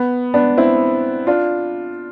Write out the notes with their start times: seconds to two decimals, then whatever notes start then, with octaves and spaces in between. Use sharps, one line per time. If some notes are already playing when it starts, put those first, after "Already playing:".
Already playing: B3
0.34 B3 D4
0.57 C4 E4
1.27 D4 F4